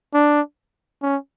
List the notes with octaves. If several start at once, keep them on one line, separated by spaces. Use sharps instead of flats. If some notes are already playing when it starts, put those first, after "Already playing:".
D4
C#4